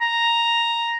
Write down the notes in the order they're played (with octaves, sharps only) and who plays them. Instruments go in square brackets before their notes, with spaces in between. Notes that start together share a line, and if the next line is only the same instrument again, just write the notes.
[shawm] A#5